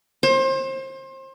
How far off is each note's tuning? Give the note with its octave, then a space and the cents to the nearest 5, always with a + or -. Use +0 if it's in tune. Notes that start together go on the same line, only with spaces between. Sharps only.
C5 +30